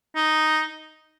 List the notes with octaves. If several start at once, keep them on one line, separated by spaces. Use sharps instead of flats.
D#4